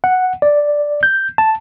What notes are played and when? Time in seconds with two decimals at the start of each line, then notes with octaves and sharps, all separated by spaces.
0.04 F#5
0.42 D5
1.03 G6
1.38 A5